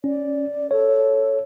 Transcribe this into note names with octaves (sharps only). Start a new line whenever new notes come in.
C#4 D5
A4 C#5